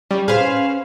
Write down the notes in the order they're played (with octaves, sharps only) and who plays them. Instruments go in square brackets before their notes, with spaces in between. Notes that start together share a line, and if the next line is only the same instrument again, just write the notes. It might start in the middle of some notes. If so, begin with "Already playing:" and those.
[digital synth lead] G3 [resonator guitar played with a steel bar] C#4
[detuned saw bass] A2 [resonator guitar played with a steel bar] G#4 B4 C5 [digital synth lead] F5
[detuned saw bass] C#4